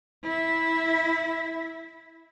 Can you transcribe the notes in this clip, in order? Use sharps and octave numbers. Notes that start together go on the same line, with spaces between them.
E4 E5